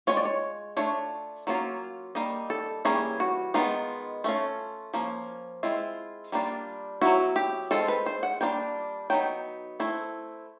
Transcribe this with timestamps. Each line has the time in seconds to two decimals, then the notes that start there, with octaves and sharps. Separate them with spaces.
0.07 G#3 C#4 F4 C#5
0.17 D5
0.25 C#5
0.77 A3 D4 F4 C#5
1.47 F#3 A#3 C#4 F4
2.15 D#3 G3 A#3 D#5
2.50 A4
2.85 E3 G3 A#3 C#4 G#4
3.20 F#4
3.54 D#3 G#3 B3 D#4 F4
4.24 A3 C#4 F4
4.94 F3 A#3 C#4
5.63 G#3 C4 E4 F4
6.32 G3 A#3 D4 F4
7.02 F#3 B3 E4 F#4
7.36 G4
7.71 G#3 C4 F4 A4
7.88 B4
8.06 C5
8.23 F#5
8.41 G3 A#3 D4 F4 G5
9.10 F#3 B3 D#4 G5
9.80 A3 C4 E4